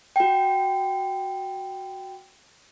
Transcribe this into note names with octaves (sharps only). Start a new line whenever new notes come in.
F#4 G5